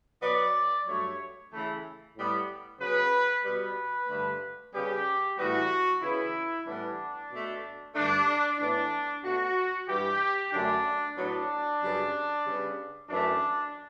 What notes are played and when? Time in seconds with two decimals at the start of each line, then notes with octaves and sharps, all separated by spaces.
0.22 B2 F#3 B3 D5
0.86 G2 F#3 A3 C#5
1.51 C#3 E3 A3
2.15 A2 G3 B3
2.79 C#3 F#3 B3 B4
3.44 B2 G3 B3 B4
4.08 G2 D3 A3
4.73 C#3 G3 B3 G4
5.37 A2 E3 G3 B3 F#4
6.01 C#3 E3 B3 E4
6.66 A2 E3 G3 B3 D4
7.30 B2 A3
7.95 G2 D3 A3 D4
8.59 A2 E3 B3 D4
9.23 B2 A3 F#4
9.88 G2 E3 G3 G4
10.52 F#2 D3 A3 D4
11.17 A2 F#3 B3 D4
11.81 F#2 C#3 G3 B3
12.46 C#3 G3 B3
13.09 F#2 E3 A3 D4